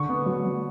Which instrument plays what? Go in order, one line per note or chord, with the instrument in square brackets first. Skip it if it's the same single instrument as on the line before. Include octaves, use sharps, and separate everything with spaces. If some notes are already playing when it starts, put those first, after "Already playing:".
Already playing: [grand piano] D3 C#6
B3
F#3
F#3